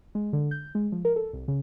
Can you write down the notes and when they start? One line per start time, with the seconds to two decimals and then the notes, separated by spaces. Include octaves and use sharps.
0.15 G#3
0.33 D3
0.51 G6
0.75 G#3
0.92 F3
1.05 A#4
1.16 A4
1.33 C2
1.48 C#3